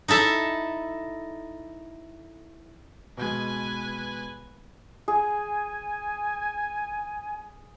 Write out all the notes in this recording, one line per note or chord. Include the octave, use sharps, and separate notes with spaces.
D#4 E4 A4 E5
B2 G#3 B4 G#5
G#4 G#5